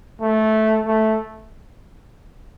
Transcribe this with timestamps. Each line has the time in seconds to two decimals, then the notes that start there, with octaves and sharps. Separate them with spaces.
0.21 A3
0.86 A3